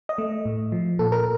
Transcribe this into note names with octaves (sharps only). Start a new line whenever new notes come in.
D#5
A3
A2
F3
A#2 A4
A#4